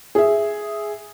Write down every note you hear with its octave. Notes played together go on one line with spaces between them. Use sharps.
G#4 E5